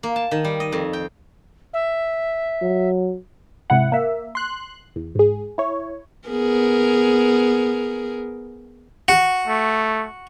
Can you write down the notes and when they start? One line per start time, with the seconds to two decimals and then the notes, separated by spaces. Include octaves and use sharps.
0.03 A#3
0.16 A5
0.31 D#3
0.44 G3
0.60 D#5
0.72 F2
0.93 G5
1.73 E5
2.62 F#3
3.70 G#2 C3 E4 F#5
3.92 A#3 E5
4.35 C6 F#6
4.96 E2
5.15 G#2 G#4
5.58 E4 C#5
6.28 B3 G#4 A#4
9.08 F#4
9.48 A3